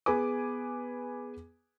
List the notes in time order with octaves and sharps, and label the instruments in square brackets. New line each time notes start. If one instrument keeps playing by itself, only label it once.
[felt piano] B3 G#4 B4 G#5 D6